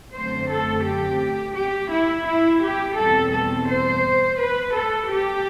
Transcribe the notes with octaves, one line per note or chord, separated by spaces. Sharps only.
F#2 D3 A3 C4 C5
A4
G4
G4
E4
E4
G4
E2 B2 G3 C4 A4
A4
C5
B4
A4
G4